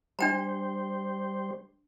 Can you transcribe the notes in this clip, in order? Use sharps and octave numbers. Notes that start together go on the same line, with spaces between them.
G3 D4 C5 G5 A#5